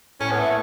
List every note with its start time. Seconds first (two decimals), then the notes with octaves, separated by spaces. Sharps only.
0.21 A2 C#4
0.31 B3
0.39 A3